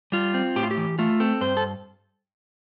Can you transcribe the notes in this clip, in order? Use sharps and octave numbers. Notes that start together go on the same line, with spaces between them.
G3 F4
C4
A2 G4
F4
G4
E3
A3 F4
C4 A4
G2 C5
A4